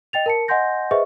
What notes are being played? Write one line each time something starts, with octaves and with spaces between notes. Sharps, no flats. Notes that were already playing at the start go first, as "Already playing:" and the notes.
D#5 G5 A6 F7
A#4 A5 C#7
D#5 F#5 G#5 C6 G6 A#6
G#4 B4 C5 D#5 E5 C#6